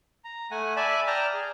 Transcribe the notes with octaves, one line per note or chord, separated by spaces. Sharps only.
A#5
A3 F#5 G#5
D5 E5 G#5 A5 B5
D5 G5 A5 A#5 D6 F6
G#4